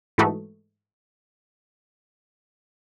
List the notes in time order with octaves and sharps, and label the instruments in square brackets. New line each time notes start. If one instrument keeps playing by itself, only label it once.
[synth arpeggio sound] G#2 E3 A3 D#4 F#4